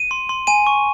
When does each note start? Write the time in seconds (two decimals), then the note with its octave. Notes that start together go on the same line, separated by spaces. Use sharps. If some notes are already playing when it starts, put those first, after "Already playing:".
Already playing: D#7
0.11 C6
0.29 C6
0.47 G#5 D#7
0.67 C#6